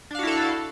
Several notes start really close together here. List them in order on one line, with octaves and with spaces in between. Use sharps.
D4 F5 F#4 E4 A4